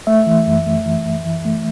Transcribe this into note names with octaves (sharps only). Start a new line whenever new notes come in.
A3 E5
E3
F#2
A3
E3
F#2
E3
A3